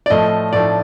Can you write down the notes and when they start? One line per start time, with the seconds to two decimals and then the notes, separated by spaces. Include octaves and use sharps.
0.06 D5
0.10 A2 F3 A3 D#5
0.53 A2 F3 A3 D5